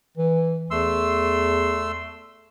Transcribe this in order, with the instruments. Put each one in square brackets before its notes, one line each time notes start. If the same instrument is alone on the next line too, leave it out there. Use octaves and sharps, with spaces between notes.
[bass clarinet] E3
[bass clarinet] E2 [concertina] A3 C6 E6